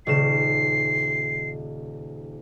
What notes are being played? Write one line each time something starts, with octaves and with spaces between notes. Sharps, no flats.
D#1 C#3 C7 E7